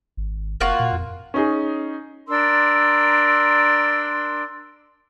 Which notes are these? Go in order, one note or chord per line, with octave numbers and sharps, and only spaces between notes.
G#1
F1 A#3 F4 F#4
A#2
F2
C#4 D#4 G#4
D4 A#4 C6 E6